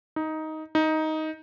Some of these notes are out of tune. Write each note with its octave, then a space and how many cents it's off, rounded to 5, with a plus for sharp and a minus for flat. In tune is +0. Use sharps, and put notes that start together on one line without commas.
D#4 +10
D#4 +10